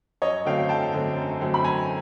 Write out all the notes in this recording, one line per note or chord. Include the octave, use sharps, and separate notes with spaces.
F#2 C#5 D#5
D3 F#3 A3 C4 F5 G5
F#2 G5 A5
D3 F#3 A3 C4
F#2
D3 F#3 A3 C4
B5
F#2 G#5 A#5